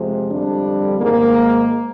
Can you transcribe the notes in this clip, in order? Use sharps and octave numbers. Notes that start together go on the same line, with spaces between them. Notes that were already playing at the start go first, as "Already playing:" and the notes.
Already playing: F2 C3 F3 G#3
F2 D3 G3 D4
G#2 D#3 G#3 A#3